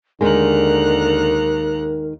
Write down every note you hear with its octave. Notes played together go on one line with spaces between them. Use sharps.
D#2 D3 D#3 G#3 A#4 A#5 F#6